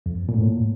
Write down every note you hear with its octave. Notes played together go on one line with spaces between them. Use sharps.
F2
A#2
A2